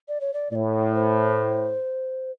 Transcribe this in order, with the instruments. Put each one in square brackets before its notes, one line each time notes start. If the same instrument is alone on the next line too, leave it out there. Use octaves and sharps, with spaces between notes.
[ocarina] D5
C#5
D5
[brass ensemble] A2 [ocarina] C#5 D5
[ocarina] C5